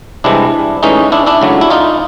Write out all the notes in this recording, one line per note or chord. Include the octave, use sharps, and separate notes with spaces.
C2 C3 E3 G#3 D4 E4
A2 E3 G#3 C#4 D#4
D4 E4
D4 E4
C#2 C#3 F#3 A3
E4
D#4 F4